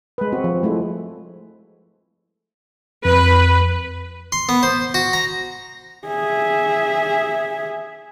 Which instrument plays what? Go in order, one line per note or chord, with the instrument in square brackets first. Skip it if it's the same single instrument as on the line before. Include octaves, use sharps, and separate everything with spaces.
[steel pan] G#3 B4
C4 F#4
F3
G#3 A3 E4
[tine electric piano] F2 [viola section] B4
[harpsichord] C6
B3
C5
F#4
A#5
[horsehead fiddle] G#4 E5